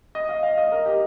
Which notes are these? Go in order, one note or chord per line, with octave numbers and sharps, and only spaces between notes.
D#5
F5
F5
D#5
A#4
G4